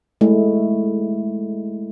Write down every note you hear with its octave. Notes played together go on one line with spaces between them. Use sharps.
G#3 A3 E4